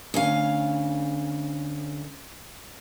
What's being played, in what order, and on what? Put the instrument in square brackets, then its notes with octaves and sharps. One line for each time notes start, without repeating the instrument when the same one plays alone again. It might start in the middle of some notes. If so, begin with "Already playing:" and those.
[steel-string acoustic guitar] D2 C#4 F5